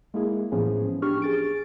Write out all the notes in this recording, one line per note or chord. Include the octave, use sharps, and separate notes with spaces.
G#3 A#3 E4 G#4
A2 E3 F3 B3 C#4 G#4
D4 G4 C#6 F6
G#4 A6 D7